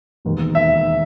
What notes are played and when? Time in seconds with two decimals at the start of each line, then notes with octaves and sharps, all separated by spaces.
0.25 E1 D#2 D#3
0.55 E5